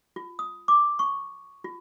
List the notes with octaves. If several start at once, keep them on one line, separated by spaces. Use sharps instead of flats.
F4
D#6
D6
C#6
F4